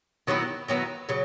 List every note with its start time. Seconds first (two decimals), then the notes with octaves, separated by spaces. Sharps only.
0.27 D#3 F#3 B3 E4
0.68 D#3 F#3 B3 E4
1.09 C#3 F#3